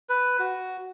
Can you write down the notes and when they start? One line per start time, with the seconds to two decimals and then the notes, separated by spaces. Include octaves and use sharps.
0.10 B4
0.40 F#4